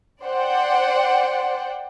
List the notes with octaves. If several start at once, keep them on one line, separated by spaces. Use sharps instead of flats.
C5 D5 F#5 G5